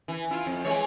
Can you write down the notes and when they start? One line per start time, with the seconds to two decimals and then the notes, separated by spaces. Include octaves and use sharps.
0.08 E3
0.31 E4 F4
0.46 F2
0.65 E3 G#3 C#5